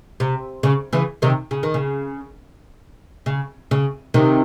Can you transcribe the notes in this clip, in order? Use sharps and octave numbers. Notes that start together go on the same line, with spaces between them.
C3
C#3
C#3 E3
C3 D#3
C#3
D#3
C#3
C#3
C#3
C3 D#3